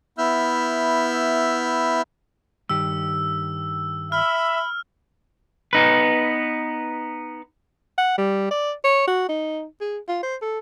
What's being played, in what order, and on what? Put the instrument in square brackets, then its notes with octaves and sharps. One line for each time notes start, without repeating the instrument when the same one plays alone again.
[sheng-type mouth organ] B3 E4 E5 E6 F6 G6
[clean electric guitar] G2 D#3 G4 [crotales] E6
[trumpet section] E5 [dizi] B5 [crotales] F6
[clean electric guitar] B3 D#4 B4
[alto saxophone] F#5
G3
D5
C#5
F#4
D#4
G#4
F4
C5
A4